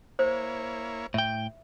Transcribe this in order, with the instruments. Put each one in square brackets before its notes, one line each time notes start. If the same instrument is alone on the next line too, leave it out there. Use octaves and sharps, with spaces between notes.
[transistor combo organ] A#3 E4 C#5 [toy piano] C5
[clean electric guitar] A2 G5 [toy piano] E5